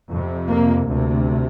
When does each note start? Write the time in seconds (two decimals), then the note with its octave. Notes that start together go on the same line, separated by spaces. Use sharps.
0.08 F2 C3
0.48 A#3
0.88 D2 C3